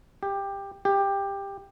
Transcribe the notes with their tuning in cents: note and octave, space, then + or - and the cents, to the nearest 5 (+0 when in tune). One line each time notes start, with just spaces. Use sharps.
G4 +15
G4 +15